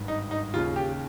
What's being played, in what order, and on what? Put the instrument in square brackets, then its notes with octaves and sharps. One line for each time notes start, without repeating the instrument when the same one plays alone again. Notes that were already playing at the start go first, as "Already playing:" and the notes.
Already playing: [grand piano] G#1 G2
D#4
D#4
D#2 C#3 F4
G4